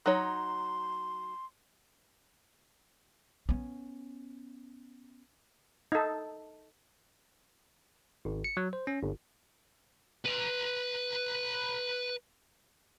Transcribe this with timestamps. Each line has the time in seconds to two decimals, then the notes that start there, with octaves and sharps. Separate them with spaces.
0.06 F#3 D#4 C#5 C6
3.49 B3 C#4
5.92 D#4 A4
8.25 G#1
8.44 C#7
8.57 F#3
8.73 C5
8.87 C#4
9.03 G1
10.26 B4 A#5